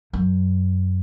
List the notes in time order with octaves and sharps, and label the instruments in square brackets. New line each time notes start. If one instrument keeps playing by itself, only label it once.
[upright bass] F#2